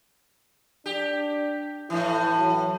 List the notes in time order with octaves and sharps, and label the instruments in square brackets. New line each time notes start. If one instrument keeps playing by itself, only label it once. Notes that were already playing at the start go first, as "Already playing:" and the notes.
[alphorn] D4 [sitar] G4
[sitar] A2 E3 [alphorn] E4
[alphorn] F#3